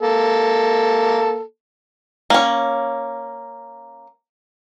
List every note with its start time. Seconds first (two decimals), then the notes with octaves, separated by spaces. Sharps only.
0.01 A#3 A4
2.30 A#3 C#4